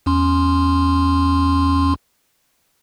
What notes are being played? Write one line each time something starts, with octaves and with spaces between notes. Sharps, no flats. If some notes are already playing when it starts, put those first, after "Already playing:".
E2 C#4 C6